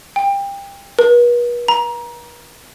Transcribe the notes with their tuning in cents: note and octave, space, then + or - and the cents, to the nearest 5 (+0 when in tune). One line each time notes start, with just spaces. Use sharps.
G5 +25
B4 -40
A#5 +25